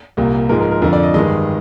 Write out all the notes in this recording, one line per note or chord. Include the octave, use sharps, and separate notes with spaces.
C2 A#2 G3 A#3
G#2 F3 G#3 A#4
A#4
A#4
F2 D3 F3 A#4
D5
D#5
G2 D#3 G#3 D#5